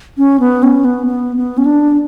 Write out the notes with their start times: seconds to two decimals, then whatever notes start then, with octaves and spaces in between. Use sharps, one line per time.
0.18 C#4
0.40 B3
0.63 C#4
0.85 B3
1.07 B3
1.36 B3
1.58 C#4
1.66 D4